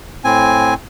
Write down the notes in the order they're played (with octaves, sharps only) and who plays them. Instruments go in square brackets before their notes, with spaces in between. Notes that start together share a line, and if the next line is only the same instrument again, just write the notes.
[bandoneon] A2 C4 G#5